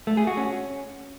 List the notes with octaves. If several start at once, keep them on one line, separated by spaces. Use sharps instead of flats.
A3
G#4
F#4
C#4